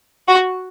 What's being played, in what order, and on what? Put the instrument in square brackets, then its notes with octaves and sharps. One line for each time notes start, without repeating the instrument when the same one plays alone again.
[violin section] F#4